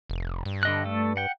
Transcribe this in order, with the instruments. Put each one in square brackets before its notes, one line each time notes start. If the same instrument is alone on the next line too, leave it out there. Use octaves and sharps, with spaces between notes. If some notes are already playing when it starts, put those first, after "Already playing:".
[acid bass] F1
G2
[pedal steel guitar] D3 D#5 F#6
A3 A4
F#5 G5